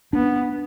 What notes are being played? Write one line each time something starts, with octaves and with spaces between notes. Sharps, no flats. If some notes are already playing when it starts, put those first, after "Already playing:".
B3 D4